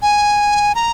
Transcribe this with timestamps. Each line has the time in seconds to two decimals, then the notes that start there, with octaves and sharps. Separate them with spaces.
0.02 G#5
0.75 A#5